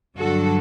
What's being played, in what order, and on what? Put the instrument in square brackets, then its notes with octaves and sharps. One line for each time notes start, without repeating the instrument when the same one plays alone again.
[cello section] G2 D3 F#3 F#4 A4